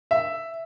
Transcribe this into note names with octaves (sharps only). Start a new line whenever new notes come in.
E5